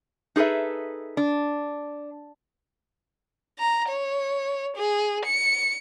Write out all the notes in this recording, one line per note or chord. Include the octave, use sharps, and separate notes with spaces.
D#4 G#4 A4 B4 E5
D4
A#5
C#5
G#4
C#7